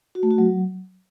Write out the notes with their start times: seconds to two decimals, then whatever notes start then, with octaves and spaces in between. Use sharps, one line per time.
0.15 F#4
0.23 A3
0.31 F#4
0.38 F#3